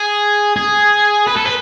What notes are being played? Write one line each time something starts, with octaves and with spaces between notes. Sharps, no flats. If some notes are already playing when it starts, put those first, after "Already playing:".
Already playing: G#4
G#4
B4
A4
B4